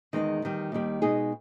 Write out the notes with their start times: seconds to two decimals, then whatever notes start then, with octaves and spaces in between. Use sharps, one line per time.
0.13 E2 D#3 G#3 B3 D#4
0.42 E2 D#3 G3
0.72 D#2 D#3 G3
1.02 B2 G#3 D#4 G#4